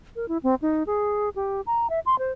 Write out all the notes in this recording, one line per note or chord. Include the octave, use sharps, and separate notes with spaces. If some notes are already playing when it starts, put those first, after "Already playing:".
A#4
E4
C4
D#4
G#4
G4
A#5
E5
C6
C5